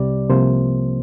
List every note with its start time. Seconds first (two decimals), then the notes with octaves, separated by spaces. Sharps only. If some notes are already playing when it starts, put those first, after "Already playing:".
Already playing: C2 C3 G3 D5
0.29 C2 C3 F3 A#3 C5